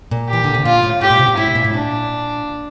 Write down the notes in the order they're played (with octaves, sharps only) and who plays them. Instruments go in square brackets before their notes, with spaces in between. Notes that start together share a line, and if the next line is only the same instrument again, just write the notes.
[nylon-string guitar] A#2
[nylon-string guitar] E3 [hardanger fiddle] G4
[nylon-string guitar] D3
C3
[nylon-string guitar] A#2 [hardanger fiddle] F4
[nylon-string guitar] A2
[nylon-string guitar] A2 [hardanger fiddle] G4
[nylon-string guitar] A#2
C3
A#2
[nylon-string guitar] A2 [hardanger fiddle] E4
[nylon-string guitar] C3
A#2
A2
[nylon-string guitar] A#2 [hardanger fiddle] D4